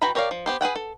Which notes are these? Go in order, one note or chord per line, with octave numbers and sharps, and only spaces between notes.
E3 F#4 G5 A#5 B5
G4 A#4 C#5 D5 F5
F3
B3 G4 C5
G#4 B4 F#5 G5
A4